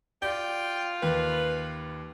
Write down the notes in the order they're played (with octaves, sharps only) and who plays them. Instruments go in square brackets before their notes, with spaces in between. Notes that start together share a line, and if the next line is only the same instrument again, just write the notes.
[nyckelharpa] F4 [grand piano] D5 [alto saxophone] G5
[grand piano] D#2 [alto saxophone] B4